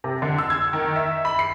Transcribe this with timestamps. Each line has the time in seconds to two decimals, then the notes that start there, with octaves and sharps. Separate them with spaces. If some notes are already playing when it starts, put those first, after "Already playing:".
0.04 C3
0.22 D3
0.39 E6
0.50 G#6
0.73 D#3
0.96 E5
1.25 B5
1.39 C7